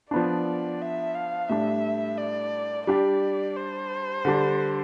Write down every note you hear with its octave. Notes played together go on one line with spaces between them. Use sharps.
F3 B3 D4 D5
E5
F5
A2 G3 D4 E5
D5
G3 D4 G4 D5
C5
D3 G3 D4